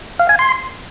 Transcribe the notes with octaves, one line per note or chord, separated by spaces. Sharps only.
F5
G#5
C6